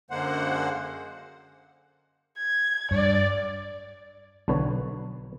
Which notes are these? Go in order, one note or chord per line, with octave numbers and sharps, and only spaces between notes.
F#2 D3 G#3 A#3 C5 F#5
G#6
G2 D5
B1 D3 B4 C#5